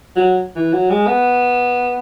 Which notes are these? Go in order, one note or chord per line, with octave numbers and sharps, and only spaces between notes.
F#3
E3
F#3
G#3
B3